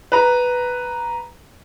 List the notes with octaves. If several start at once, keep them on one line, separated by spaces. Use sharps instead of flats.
B4 A#5